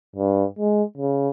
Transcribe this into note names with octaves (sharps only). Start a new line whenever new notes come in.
G2
G#3
C#3